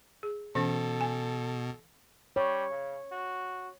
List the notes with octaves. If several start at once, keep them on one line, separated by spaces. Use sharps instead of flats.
G#4
B2 E3 C#4 A4
G#5
G3 C#5
C#3
F#4